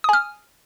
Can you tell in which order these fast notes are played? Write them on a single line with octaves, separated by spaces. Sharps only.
D#6 G#5 F6